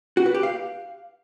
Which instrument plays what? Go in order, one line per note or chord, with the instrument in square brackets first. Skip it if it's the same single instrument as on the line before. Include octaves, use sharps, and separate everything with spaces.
[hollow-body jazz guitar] F#4
B4
G4
F5